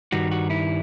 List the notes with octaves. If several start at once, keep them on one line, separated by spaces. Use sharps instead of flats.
G2 D#3 G3 F#4
F#4
E4